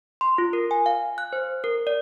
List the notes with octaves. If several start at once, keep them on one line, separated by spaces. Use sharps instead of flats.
C6
F4
A#4
G#5
F5
F#6
C5
A#4
D5